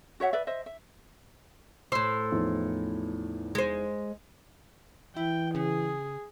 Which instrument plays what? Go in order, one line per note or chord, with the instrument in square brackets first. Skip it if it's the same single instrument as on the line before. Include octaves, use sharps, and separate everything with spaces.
[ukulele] F#4 C#5 E5 F#5
B4 D5 E5
C5 D#5 E5
E5
[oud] A2 C5 [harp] C6 E6
[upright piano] E2 F3 D#4
[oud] G#3 C5
[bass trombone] E3 [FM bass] E4 [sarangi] G5
[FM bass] C#3 [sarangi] G#4